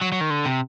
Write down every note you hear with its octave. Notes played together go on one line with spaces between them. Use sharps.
F#3
F#3
D#3
D3
C3